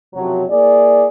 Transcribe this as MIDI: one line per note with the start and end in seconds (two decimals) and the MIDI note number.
0.14 0.43 30
0.14 0.43 48
0.14 0.43 53
0.14 0.43 54
0.49 1.06 58
0.49 1.06 64
0.49 1.06 68
0.49 1.06 74